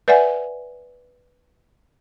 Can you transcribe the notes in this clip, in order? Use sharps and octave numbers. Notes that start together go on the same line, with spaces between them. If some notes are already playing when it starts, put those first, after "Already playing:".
B4 D5 E5 F#5 G#5